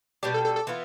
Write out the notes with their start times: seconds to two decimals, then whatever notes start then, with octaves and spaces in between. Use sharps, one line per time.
0.23 B2 G3 D4 G4
0.34 A4
0.45 A4
0.56 A4
0.67 E3 B3 F4